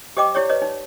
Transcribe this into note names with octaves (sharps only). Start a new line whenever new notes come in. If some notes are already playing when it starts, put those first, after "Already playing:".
G4 C5 D#5 G5 D6
E4 G4 C#5 D5
B4 C#5 D#5
D#4